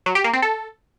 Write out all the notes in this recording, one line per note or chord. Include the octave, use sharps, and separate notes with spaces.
F#3
G4
A#3
C4
A4